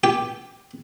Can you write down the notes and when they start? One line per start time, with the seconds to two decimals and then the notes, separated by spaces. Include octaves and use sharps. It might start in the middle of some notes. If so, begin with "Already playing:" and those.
0.04 G4